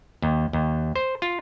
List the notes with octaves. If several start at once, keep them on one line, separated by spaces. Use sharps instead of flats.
D#2
D#2
C5
F4